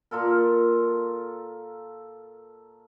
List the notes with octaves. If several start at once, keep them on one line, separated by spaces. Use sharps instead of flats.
A#2 F4 A4 A#4